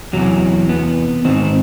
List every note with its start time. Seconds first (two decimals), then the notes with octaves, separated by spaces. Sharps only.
0.13 E2 C3 E3 F#3
0.69 B3
1.25 G#2 D#3 C4